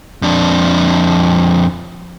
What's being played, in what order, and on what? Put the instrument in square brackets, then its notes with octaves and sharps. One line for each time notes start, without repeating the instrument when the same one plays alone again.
[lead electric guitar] F2 D4